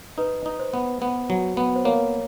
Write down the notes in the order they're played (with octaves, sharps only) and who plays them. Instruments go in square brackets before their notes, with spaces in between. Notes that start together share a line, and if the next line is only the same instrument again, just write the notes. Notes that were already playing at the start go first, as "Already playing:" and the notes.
[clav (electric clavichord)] D#4 [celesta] B4
[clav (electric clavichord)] D#4
[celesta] C5
[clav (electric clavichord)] B3
B3
F#3
B3
[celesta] C5
[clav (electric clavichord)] A#3 [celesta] C#5